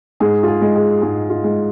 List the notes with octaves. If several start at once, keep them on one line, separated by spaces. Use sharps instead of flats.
G#2 G#4
F4
G#4
G#3
G#4
G#2 G#4
F4
G#3